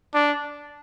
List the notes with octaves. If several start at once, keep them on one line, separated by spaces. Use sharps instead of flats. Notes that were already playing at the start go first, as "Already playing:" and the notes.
D4